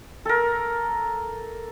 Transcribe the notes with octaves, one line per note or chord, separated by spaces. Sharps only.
A4 A#4